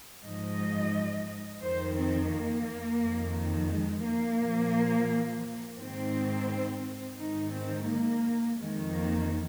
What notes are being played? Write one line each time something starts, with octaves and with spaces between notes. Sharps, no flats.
G#2 F3 D#5
F2 D#3 C5
C4
A#3
F2 D#3
G#3
A#3
A#2 F3
G#2 D#3 C4
G#2 D#3 D#4
C4
A#3
F2 D#3 G#3
A#3